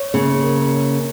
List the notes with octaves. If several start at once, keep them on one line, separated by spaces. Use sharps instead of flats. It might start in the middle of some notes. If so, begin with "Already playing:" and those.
Already playing: C#5
C#3 A#3
A#4